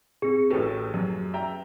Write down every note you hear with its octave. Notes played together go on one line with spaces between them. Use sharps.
C4 G#4 C#7
A1 A2 A3 F#4 G4 B4
F#2
E5 G5 A#5